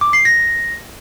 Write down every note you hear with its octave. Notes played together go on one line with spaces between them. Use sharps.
D6
C7
A#6